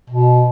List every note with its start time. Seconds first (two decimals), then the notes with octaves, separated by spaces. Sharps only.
0.10 B2